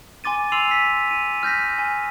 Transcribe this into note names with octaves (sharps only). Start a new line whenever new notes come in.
G#5 C6 D6 A6 D#7
C6 E6 C7 D#7 F7 F#7
B6
D#7
F6 G6 A#6 B6
G#5